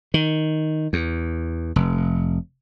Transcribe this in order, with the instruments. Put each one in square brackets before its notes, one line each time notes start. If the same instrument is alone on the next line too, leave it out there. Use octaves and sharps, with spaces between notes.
[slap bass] D#3
E2
F1